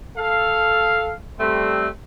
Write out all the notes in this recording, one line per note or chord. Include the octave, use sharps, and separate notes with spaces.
A4 F5
G3 A3 C4